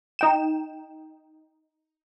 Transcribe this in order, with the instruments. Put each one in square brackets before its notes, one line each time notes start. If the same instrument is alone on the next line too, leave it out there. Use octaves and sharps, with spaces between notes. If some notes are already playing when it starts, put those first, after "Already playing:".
[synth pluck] D#4 G5 E7